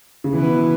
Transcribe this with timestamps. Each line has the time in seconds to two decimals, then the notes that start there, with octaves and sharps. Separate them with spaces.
0.24 C#3
0.33 B2 E3 B3 E4 B4